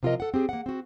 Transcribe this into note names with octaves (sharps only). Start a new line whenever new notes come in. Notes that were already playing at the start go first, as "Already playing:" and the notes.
C3 F3 F4 A4 A#4 D#5
A4 F#5
C4 G4 G#4
A#3 F#5
C4 F#4